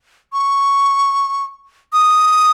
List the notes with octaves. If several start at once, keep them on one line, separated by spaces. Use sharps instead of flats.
C#6
D#6